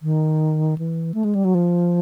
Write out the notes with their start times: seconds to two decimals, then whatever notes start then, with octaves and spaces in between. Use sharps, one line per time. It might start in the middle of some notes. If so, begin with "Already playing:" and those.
0.02 D#3
0.78 E3
1.14 A3
1.24 G#3
1.35 G3
1.45 F#3
1.55 F3